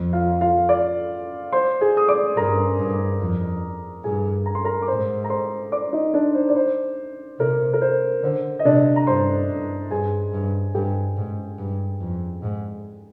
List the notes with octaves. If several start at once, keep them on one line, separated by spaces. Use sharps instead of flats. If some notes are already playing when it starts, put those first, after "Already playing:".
Already playing: F2
F4 F5
F4 F5
D5 D6
C5 C6
G#4 G#5
D#6
D5 D6
G2 A#4 A#5
G2
F2
G2 G#4 G#5
A#5
C6
A#4 A#5
D6
G#2 C5 C6
A#5
C5 C6
D5 D6
D#4 D#5
D4 D5
C5
D5
C5
C3 A#4
A#4
C5
D3 C5
D#5
C3 D4 D5
A#5
G2 C5 C6
G2
G2 G#4 G#5
G2
G2 G4 G5
G#2
G2
F2
G#2